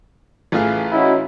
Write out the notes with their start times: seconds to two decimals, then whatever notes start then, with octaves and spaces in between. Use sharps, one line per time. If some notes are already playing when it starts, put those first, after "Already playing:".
0.52 A1 E3 A3 F4 G#4 F6
0.92 C#4 D#4 E4 F#4